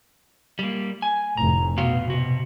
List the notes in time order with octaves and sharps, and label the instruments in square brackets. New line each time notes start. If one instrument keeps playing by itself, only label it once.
[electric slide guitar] G3 A#3
G#5
[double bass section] F1 A2 [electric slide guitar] A#5
[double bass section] B2 [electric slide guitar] B3 F#4 F5
[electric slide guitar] C3 F#4